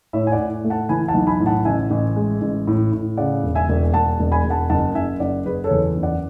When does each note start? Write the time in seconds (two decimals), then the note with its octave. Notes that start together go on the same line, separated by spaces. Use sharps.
0.13 A2 C#5 E5
0.27 G#5
0.32 D5 F#5
0.38 A2
0.64 A3
0.70 F#5 A5
0.89 E3 G#5 B5
1.08 F#5 A5
1.14 B1
1.27 G#5 B5
1.40 A2
1.46 F#5 A5
1.65 A1 E5 G#5
1.91 A1
2.16 G#3
2.41 A1
2.67 A2
2.92 A2
3.17 C#3 D5 F#5
3.43 E1
3.55 E5 G#5
3.69 E1
3.93 E1 F#5 A5
4.20 E1
4.32 G#5 B5
4.44 E1
4.50 F#5 A5
4.70 F#1 F#5 A5
4.95 F#1 E5 G#5
5.20 F#1 D5 F#5
5.46 F#1 G#4 B4
5.64 A4 C#5
5.71 E2
5.97 F#1
6.03 D5 F#5